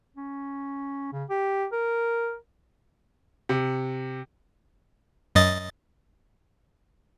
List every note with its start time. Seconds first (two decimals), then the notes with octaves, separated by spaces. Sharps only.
0.17 C#4
1.13 C#3
1.30 G4
1.72 A#4
3.49 C3
5.35 F#2 D#5 A6